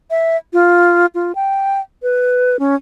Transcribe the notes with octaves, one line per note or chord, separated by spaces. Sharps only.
E5
F4
F4
G5
B4
C#4